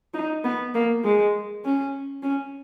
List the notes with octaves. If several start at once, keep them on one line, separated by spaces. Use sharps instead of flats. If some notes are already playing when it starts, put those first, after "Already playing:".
D#4
B3
A#3
G#3
C#4
C#4